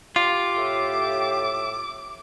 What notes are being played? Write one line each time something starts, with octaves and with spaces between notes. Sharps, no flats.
F4 G4 D6
A2 E5